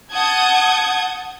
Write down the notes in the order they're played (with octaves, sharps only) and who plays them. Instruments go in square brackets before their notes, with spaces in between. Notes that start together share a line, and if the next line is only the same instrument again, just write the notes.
[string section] F#5 A5 D#6 G6 G#6